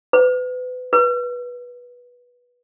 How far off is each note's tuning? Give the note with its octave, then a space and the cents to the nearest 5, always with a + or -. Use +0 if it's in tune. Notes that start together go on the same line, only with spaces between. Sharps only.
B4 +30
B4 -15